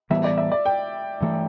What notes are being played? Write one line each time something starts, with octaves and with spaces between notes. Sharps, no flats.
A2 E3 G3 B3 E5
D5
E5
D5
G5
G2 E3 A3